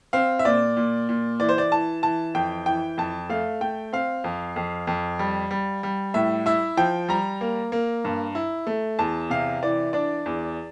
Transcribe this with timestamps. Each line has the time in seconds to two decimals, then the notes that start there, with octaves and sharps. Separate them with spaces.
0.13 C4 F5
0.39 E5
0.45 A#2 D5
0.77 A#2
1.09 A#2
1.40 E3 D5
1.49 C5
1.58 D5
1.72 E3 A5
2.03 E3 A5
2.34 F2 G5
2.66 E3 G5
2.98 F2 A5
3.30 A3 F5
3.61 A3 G5
3.93 C4 F5
4.24 F2
4.56 F2
4.87 F2
5.19 G3
5.51 G3
5.83 G3
6.14 A2 E5
6.46 E4 E5
6.77 F3 G5
7.09 G3 A#5
7.41 A#3
7.72 A#3
8.05 G2
8.35 E4
8.67 A3
8.99 E2 A5
9.30 C3 F5
9.63 E3 D5
9.93 D4 D5
10.26 E2